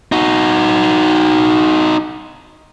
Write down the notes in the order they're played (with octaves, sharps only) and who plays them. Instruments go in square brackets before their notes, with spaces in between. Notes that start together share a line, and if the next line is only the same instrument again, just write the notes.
[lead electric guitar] D#4 F#4